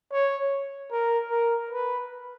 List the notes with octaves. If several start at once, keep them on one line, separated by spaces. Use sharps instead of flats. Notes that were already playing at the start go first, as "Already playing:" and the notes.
C#5
A#4
A#4
B4